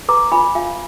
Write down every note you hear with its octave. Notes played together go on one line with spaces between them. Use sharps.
B4 A#5 D6
F4 G#5 B5
F4 F5 G#5